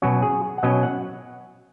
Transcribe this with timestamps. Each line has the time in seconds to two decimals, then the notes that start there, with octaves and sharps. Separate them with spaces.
0.02 B2 F#3 C#4 F#4
0.22 G#4
0.58 F#5
0.63 B2 F#3 C#4 D#5
0.83 F#5